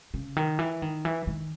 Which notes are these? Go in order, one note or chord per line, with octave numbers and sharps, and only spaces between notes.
C#3
D#3
E3
D#3
E3
D#3